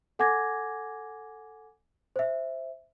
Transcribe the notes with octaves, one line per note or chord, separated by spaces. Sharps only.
A4 F#5 G#5 D6 G#6 A#6
C5 E5